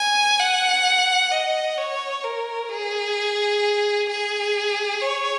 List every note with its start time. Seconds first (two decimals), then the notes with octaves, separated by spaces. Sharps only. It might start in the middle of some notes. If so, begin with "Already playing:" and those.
Already playing: G#5
0.40 F#5
1.32 D#5
1.78 C#5
2.24 A#4
2.70 G#4
4.09 G#4
5.01 C#5